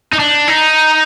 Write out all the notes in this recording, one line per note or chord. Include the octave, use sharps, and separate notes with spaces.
D#4
D4
D#4